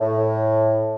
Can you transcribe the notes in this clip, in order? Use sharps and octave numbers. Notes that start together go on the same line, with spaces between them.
A2